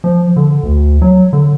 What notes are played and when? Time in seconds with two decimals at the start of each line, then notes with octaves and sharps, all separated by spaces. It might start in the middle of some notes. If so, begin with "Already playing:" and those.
0.04 F3
0.36 D3
0.63 D2
1.02 F#3
1.33 D3